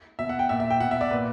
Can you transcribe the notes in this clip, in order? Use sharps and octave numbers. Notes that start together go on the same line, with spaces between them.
B2 E5
F#5
G5
A#2 E5
E5
G5
B2 F#5
E5
D5
A#2 B4